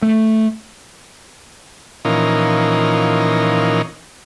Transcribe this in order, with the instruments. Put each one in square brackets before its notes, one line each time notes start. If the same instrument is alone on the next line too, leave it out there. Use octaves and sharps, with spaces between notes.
[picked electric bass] A3
[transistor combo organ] A#2 E3 F3 C#4 D#4 A#4